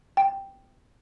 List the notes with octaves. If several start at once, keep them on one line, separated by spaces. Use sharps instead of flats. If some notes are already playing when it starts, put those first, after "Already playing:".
G5